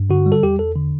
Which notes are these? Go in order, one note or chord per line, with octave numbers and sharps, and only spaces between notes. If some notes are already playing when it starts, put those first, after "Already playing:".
Already playing: G2
D3 F#4
G3
A4
E2 G4
E2 A4
D3